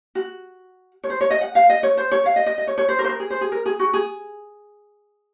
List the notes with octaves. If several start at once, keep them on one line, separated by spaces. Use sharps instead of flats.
F#4
C#5
C5
C#5
D#5
F#5
F5
D#5
C#5
C5
C#5
F5
D#5
D#5
D#5
C#5
C#5
C5
A#4
C5
A#4
G#4
C5
G#4
A#4
G#4
F#4
G#4